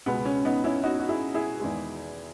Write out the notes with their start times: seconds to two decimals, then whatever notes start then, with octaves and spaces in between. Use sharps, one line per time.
0.06 C#2 B2 G#3 B3
0.25 C#4
0.45 B3 D#4
0.64 C#4 E4
0.83 D#4 F#4
1.00 F#4
1.09 E4 G#4
1.34 E4 G#4
1.60 E2 D#3 G#3